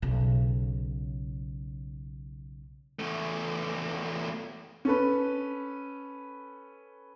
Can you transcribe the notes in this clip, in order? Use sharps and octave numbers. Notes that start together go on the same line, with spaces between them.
B1 C#3
E2 A3
C#4 A4 B4